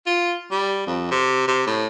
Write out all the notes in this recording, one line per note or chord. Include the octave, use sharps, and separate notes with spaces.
F4
G3
F2
C3
C3
A2